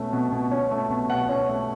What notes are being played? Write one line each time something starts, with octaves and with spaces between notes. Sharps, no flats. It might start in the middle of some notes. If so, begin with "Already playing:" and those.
Already playing: B2 A3 C#4
B2
B2
C#4
A3
B2
B2 F#5
C#4
A3